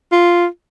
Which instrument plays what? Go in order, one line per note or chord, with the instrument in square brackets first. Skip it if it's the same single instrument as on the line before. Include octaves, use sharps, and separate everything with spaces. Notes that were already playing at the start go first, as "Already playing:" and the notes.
[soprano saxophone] F4